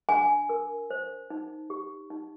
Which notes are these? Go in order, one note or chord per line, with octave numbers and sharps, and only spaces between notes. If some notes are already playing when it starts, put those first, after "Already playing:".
D4 G#5
A#4
C5
D#4
G4
D#4